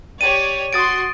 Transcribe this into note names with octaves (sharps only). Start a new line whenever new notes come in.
G4 C#5 D5 D#7
F#4 C6 D#6 A6 D7